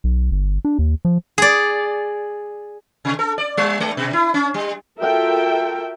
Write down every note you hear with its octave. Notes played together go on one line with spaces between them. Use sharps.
B1
G1
D4
D#2
F3
G#4 D5
C3
A4
D5
G3
G#3
B2
E4
C#4
G3
F4 F#4 A4 A#4 E5 G5